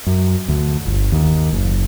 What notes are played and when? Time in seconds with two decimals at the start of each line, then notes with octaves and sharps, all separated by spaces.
0.07 F#2
0.48 D2
0.87 G1
1.12 D#2
1.53 F#1